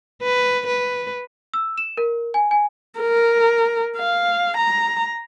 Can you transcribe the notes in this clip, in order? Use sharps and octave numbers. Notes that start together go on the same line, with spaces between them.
B4
B4
E6
E7
A#4
G#5
G#5
A#4
F5
A#5